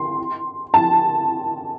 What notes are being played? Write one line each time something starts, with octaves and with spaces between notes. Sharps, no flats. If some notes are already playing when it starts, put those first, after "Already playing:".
Already playing: C6
A5